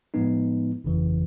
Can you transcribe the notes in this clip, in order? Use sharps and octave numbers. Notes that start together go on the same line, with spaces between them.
A2 F3 G#3 B3 D#4
G1 F2 C#3 E3